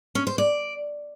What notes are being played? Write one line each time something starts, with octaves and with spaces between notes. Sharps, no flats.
C#4
C5
D5